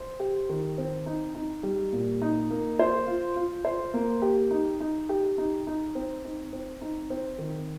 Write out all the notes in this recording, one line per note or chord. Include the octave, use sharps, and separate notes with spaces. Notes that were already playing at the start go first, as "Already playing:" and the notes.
Already playing: C5
G4
D#3
C4
D#4
D#4
G3
A#2
D#4
A#3
C5
F4
F4
C5
A#3
G4
D#4
D#4
G4
D#4
D#4
C4
D#4
C4
D#4
C4
D#3